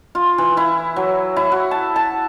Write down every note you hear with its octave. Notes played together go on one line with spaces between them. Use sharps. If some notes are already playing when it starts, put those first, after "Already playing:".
F4
E3
E4
F#3
E4
F#4
A5
A5